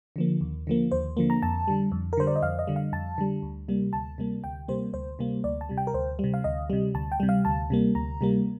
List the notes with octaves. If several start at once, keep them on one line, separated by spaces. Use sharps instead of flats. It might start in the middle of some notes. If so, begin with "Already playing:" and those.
D3 F3 A#3
D#2
D3 F3 A#3
D#2 C5
D3 F3 A#3
A#5
F2 A5
D3 G3
F2
A#4
D3 G3 C5
D5
D#5
F2 F5
D#5
D3 G3
F5
F2 A5
D3 G3
D2
C3 G3 A#3
D2 A5
C3 G3 A#3
D2 G5
C3 G3 A#3 C5
D2 C5
C3 G3 A#3
D2 D5
A5
C3 G3
G5
A#4
D2 C5
C3 G3
F5
D2 D#5
C3 G3
D2 A5
G5
C3 G3
F5
D2 A5
C3 G3 A#3
D2 A#5
C3 G3 A#3